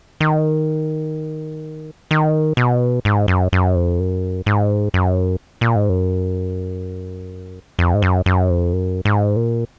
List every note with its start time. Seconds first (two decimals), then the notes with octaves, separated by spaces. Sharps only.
0.20 D#3
2.11 D#3
2.57 B2
3.05 G#2
3.28 F#2
3.52 F#2
3.75 F2
3.99 F#2
4.46 G#2
4.94 F#2
5.61 A#2
5.76 G#2
5.89 F#2
7.79 F2
7.94 G#2
8.02 F#2
8.26 F#2
8.50 F2
8.73 F#2
9.05 G#2
9.36 A#2